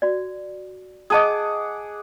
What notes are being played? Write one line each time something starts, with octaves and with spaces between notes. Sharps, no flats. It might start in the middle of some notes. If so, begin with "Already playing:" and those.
F#4 D5
G#4 D#5 F#5 A5 D6 D#6